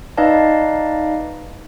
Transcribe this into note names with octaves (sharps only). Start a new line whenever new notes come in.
D#4 B4 D5 D#5 F5 A5